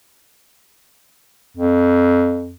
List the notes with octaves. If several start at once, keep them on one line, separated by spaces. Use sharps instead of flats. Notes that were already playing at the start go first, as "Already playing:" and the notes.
F2